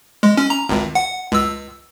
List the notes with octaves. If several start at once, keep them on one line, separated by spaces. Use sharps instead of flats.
G#3
C#4
A#5
G#1 C#2
F#5
C#2 E6